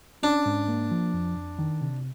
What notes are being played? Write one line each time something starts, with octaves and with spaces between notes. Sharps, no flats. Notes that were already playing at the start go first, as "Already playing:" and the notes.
C#4 D4
G#2
A#3
F3
F2
F2
D#3
C3